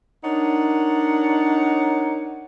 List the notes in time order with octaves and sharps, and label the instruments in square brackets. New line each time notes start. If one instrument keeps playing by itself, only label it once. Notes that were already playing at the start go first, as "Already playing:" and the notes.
[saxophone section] D4 D#4 A#4 C#5 F#5